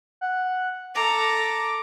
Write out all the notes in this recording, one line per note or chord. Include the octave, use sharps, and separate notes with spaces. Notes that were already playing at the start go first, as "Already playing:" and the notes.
F#5
A4 A#5 D6